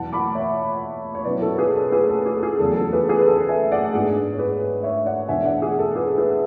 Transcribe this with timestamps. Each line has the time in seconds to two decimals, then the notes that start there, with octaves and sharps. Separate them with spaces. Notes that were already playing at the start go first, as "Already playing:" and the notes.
Already playing: E2 B2 F#3 B3 E4 F#5 A5
0.12 B5 D6
0.35 C#5 E5
1.15 C#5
1.24 B2 F#3 C#4 E4 B4 D5
1.42 A4 C#5
1.58 G#4 B4
1.75 A4
1.92 G#4 B4
2.09 A4
2.26 G#4
2.43 G#4
2.59 E2 C#3 F#3 A4
2.76 A4
2.93 G#4 B4
3.09 G#4
3.19 B4
3.27 A4
3.49 E5 G#5
3.72 D5 F#5
3.94 G#2 G#3 B3 D4 G#4
4.34 C#5
4.39 G#4 B4
4.83 C#5 E5
5.06 D5 F#5
5.28 E2 B2 G#3 D4 E5 G#5
5.45 D5 F#5
5.62 G#4
5.79 A4
5.96 G#4 B4
6.18 G#4 B4